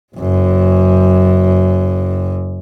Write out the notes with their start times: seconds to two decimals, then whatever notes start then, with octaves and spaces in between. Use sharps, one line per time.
0.15 F#1 F#2